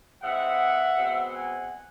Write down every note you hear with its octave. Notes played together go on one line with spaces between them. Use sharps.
E3 G#3 C4 E5 F#5
B2 G#3 C4
F#5 G#5